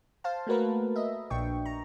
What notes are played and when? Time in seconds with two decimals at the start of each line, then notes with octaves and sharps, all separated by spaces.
0.24 C5 F5 A5
0.47 A3 A#3 F#4 A#4 B4
0.96 D#5 E5
1.30 A#1 A#2 D4 G5 C#6
1.65 A#5